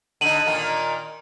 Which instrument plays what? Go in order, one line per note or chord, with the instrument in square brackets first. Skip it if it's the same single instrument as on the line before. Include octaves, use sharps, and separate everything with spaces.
[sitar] D3 D#4 [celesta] D#7 F#7
[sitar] A#2 D#3 A#3